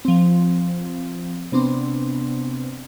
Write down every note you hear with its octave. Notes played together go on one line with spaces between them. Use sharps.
F3 C4
C3 B3 C4 D4